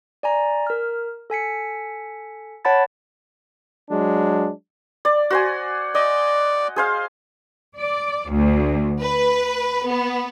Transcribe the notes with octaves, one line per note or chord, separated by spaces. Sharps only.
D5 G#5 A#5
A#4 F6
A4 G#5 B6 C#7
C#5 F#5 A5 B5 A6
F#3 G#3 D4
D5
F#4 C5 G#5
D5 D#5
G#4 C5 F5
D5
D2
B4
B3